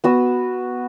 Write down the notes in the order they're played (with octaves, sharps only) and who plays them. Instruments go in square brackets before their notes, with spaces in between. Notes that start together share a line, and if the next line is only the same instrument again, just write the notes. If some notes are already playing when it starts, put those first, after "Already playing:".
[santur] B3 F#4 E6